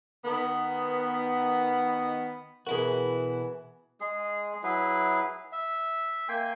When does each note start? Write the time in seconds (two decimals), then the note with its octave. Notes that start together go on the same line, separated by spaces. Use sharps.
0.25 D#3 B3
2.67 B2 E3 E4 F#4 G#4 A#4
4.00 G#3 G#4
4.63 F#3 E4 G#4 B4
5.52 E5
6.29 A#3 G5 G#5 C6